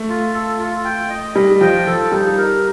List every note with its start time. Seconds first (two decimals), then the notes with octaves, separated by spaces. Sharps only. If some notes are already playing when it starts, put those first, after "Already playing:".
Already playing: A3
0.09 F4
0.34 A4
0.59 F4
0.84 G5
1.10 D#5
1.36 G3 D#5
1.61 F3 G5
1.87 F3 A4
2.12 G3 D#4
2.37 A#4